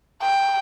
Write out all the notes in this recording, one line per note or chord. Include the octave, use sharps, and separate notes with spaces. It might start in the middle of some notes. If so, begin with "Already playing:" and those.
G5